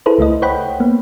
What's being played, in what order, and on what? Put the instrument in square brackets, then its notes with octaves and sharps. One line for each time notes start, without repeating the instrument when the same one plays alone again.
[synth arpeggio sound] E4 G#4 A4 B4 C5
C#2 A3 E4 D#5
C5 C#5 F#5 G5 B5
A#3 B3